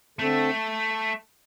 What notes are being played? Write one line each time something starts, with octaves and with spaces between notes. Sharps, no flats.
D3 A3 C4 A4